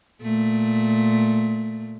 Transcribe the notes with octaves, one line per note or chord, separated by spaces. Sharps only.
A#2 A3